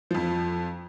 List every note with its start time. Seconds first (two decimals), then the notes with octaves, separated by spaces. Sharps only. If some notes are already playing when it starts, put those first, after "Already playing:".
0.11 F2 F3